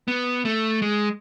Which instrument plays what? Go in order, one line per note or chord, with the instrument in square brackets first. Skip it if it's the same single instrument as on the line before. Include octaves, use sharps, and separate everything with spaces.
[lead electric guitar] B3
A3
G#3